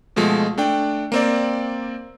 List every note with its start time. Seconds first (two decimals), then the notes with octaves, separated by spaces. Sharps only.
0.16 B2 F3 G#3 A3
0.58 A3 D4 G5
1.12 A#3 C4 D5